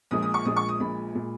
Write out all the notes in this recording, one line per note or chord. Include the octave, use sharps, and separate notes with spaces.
A#1 A#2 G#3 D#6
D#6
C#6
A#1 A#2 G#3 D#6
C#6
D#6
A#1 A#2 G#3 B5
A#2 G#3